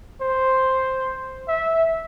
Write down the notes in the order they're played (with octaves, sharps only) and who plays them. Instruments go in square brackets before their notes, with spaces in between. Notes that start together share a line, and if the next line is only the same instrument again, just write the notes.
[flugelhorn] C5
E5